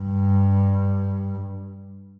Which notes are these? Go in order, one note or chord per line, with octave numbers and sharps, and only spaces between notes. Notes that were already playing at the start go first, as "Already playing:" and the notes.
Already playing: G2